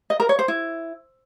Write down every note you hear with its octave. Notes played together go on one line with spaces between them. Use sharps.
D#5
A#4
C#5
C5
E4